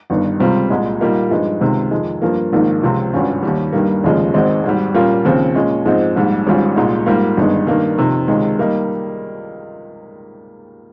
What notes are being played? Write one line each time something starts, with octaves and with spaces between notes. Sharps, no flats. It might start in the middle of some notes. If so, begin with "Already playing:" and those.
G1 G2 D#3
C#2 C3 G3 C4 F4
C2 A#2 G#3
A#2 G3 A#3 D#4
G2 F3 G#3 D#4
C#2 C3 D#3
F2 D#3 G#3
G2 F3 A#3
A#1 G#2 D#3 A#3
C#2 C3 F3 C4 F4
G#1 G2 G3 C#4 F4
D#2 D#3 G3
G2 D#3 G3 A#3
F1 D#2 C#3 F3 G#3
G#1 G#2 D#3 G#3 C4
G#1 G#2 G3
A#2 G3 A#3 C#4 F4
D#2 C#3 F3 C4
A#2 G#3 C#4
G#2 F3 G#3 C4 D#4
A#1 G#2 G3
G#1 G#2 G3 C#4 F4
C2 A#2 G#3 D#4
G#2 G3 A#3 F4
G1 G2 D#3 G#3
G2 D#3 A#3
F2 C3 D#3
C#2 C3 D#3 G#3
G3 A#3 D#4